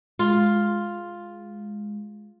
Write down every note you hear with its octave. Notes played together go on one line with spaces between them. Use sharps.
G#3 F4